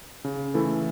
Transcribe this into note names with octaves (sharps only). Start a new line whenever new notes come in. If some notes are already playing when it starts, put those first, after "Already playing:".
C#3
E3 A3 E4 A4